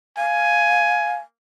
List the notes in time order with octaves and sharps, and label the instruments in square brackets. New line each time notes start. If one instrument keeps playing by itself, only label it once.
[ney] F5 [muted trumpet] G#5